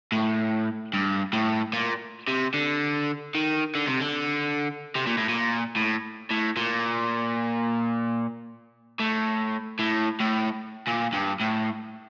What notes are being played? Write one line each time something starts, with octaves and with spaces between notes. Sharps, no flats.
A2
G2
A2
A#2
C3
D3
D#3
D3
C3
D3
C3
A#2
A2
A#2
A2
A2
A#2
A2
A2
A2
A#2
G2
A2